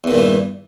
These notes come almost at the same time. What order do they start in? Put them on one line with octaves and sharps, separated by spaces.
E2 D#3 A#2 G2 E3